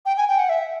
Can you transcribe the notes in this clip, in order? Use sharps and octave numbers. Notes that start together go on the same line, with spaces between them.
G5
G#5
G5
F#5
E5